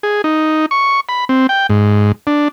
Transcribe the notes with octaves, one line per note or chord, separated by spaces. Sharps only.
G#4
D#4
C#6
B5
C4
G5
G#2
D4